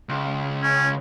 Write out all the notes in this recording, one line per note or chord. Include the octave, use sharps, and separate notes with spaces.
C#2
C#4